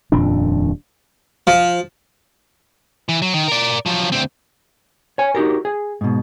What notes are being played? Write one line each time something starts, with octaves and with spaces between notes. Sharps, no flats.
D#1 F2 A#2 D4
F3
E3
F#3
D#3
A#4 D5
F3 F#3
D2 C4
C#5 G#5
D#4 F#4 G4 A#4
G#4
G#2 B2